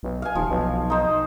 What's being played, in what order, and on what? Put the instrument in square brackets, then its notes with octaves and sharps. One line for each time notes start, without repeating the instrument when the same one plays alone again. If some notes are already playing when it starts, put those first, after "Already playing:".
[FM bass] B1
[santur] F5 G#5
[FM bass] D#1 [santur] F3
[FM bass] B1
[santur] D#4 C5